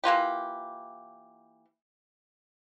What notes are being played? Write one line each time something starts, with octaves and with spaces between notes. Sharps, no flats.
E3 A#3 F4 G4